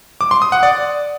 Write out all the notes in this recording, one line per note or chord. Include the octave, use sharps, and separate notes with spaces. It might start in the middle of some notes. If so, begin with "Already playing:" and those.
D6
C6
D#6
F#5
D5